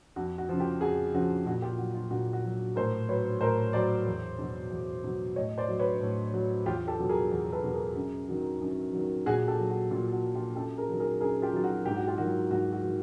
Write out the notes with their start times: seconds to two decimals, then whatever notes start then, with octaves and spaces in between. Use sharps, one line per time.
0.16 F2 F#4
0.38 F#4
0.49 C#3 F3
0.59 F4 G4
0.81 F2 F#4 G#4
1.14 C#3 F3 F#4
1.46 A#2 F#4
1.62 F4 G4
1.78 F#3 F#4
1.94 F4
2.11 A#2 F#4
2.33 F#4
2.44 F#3
2.76 A2 A#4 C5
3.09 F#3 B4 C#5
3.41 A2 A#4 C5
3.73 F#3 C5 D5
4.07 E2
4.39 B2 F#3
4.71 E2
5.04 B2 F#3
5.36 A2 C#5 D#5
5.58 C5 D5
5.68 F#3
5.79 B4 C#5
6.01 A2
6.34 F#3
6.66 E2 F4 G4
6.88 G4 A4
6.99 B2 F#3
7.09 G#4 A#4
7.31 E2
7.52 A4 B4
7.64 B2 F#3
7.74 G#4 A#4
7.96 F#2
8.29 D#3 F#3
8.62 F#2
8.93 D#3 F#3
9.26 A#2 F#4 G#4
9.48 G4 A4
9.58 F#3
9.70 F#4
9.91 A#2 F4
10.12 F#4
10.23 F#3
10.35 F4 G4
10.56 F#2 G4 A4
10.78 G#4 A#4
10.89 D#3 F#3
11.00 G#4 A#4
11.20 F#2 G#4 A#4
11.42 F4 G4
11.53 D#3 F#3 F4
11.64 F#4
11.86 G#2 G4
11.96 F#4
12.07 F4 G4
12.18 D#3 F#3 F#4
12.51 G#2 F#4
12.73 F#4
12.83 D#3 F#3